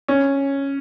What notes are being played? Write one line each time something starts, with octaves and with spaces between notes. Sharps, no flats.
C#4